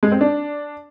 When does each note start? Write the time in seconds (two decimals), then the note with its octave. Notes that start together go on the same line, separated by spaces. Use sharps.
0.03 G#3
0.12 C4
0.21 D4